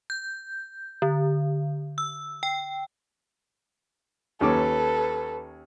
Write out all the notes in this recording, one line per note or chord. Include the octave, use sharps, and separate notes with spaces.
G6
D3
E6
G5
D#2 C#4 A4 B4 D6